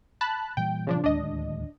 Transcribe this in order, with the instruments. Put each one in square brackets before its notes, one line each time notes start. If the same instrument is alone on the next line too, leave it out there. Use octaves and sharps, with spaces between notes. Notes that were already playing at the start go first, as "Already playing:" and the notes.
[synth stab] A5 B5 F#6
[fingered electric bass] A#2 E3 G3 [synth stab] G5
[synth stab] C#3 F3 D4
[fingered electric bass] D1 D#2 G#3 [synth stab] D4 D#5